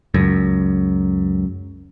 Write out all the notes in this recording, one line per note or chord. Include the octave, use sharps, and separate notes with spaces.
C#2 F#2